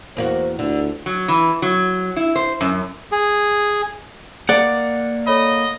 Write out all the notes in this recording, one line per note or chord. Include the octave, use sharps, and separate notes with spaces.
E2 A#3 F#4 C5
D2 D3
F#3
E3
F#3
E4
C5
F#2
G#4
A#3 D5 F#5
A4 C#5 D#5 B5